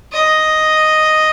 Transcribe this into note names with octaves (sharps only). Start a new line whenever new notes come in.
D#5